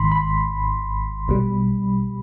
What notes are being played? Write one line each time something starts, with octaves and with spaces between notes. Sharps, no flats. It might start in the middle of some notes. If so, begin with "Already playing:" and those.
Already playing: G#1 G#2 D#3 B5 C6
B5
B1 B2 G3